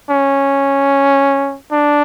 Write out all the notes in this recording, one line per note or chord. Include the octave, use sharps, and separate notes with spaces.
C#4
D4